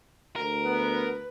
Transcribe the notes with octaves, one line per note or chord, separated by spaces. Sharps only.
D2 A#4
B3 B4